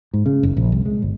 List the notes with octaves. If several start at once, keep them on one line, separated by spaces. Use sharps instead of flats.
G#2
C#3
F#1
A#1
C2
G#3
G1